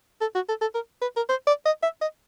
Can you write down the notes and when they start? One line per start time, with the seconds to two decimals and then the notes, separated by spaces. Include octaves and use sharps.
0.21 A4
0.35 F#4
0.49 A4
0.61 A4
0.75 A#4
1.02 B4
1.16 A#4
1.29 C5
1.47 D5
1.66 D#5
1.83 E5
2.01 D#5